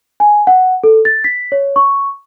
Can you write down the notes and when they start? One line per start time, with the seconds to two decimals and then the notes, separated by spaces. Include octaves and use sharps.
0.20 G#5
0.47 F#5
0.84 A4
1.05 A6
1.24 B6
1.52 C#5
1.76 C#6